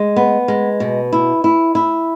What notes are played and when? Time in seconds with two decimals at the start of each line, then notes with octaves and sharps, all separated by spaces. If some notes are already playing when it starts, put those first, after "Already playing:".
Already playing: G#3
0.16 B3
0.48 G#3
0.80 B2
1.12 E4
1.44 E4
1.75 E4